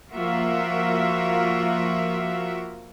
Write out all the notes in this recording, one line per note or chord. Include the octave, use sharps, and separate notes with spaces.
F3 A#3 F4 F#4 A#4 E5